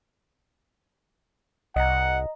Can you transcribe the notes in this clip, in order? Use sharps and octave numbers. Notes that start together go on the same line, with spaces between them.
C2 D#5 F#5 A#5